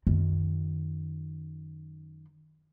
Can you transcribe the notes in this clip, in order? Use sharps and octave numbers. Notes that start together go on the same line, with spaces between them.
F#2 D#3